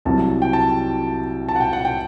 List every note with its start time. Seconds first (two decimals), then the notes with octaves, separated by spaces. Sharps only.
0.05 C2 C3 F#3 A5
0.42 G5
0.53 A5
1.49 A5
1.56 F#5
1.60 G5
1.73 F#5
1.85 G5